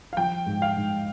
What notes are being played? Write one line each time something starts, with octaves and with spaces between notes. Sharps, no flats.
F5
F3 G5
G#2
F5
G#2